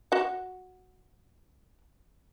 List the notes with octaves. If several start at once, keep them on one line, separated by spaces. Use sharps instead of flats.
F#4 F#5